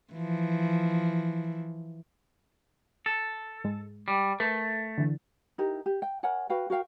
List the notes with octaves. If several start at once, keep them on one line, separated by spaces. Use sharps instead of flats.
E3 F3
A4
G#2 G#3
G3
A3 A#4 B4
D3 E3
D#4 E4 G4 A#4
G4
G5
A#4 C#5 F#5 G#5
F#4 B4 F5 G5
F#4 A#4 F5 G5